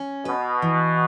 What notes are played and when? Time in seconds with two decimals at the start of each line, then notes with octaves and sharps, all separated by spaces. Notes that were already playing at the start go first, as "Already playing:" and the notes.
Already playing: C#4
0.25 B2 B4
0.62 E3